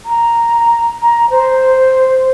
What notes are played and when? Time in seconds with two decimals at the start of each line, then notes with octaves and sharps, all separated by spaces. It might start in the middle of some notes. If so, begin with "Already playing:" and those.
0.05 A#5
1.00 A#5
1.30 C5